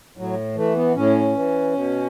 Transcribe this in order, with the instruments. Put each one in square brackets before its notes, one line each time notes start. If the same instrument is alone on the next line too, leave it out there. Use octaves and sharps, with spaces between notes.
[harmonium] A2 F#3
E3 A3
B3
A2 C#4
E3
B2